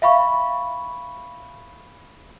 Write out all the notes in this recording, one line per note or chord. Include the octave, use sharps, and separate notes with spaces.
E5 F5 B5 C#6